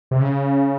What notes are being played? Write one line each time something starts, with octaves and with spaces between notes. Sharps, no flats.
C3
C#3